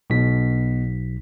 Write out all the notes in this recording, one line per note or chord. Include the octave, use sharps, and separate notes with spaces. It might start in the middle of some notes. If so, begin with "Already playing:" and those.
B1 B2 B6